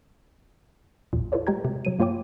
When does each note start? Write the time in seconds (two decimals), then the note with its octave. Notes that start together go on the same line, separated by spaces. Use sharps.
1.13 A1 E2 A#2
1.32 E4 F4 A4 B4 C#5 D5
1.47 G#3 G4 G5 A#5 G#6
1.65 C3
1.85 C3 F#3 D#7
1.99 G2 A#3 F4 C#5 G5 D6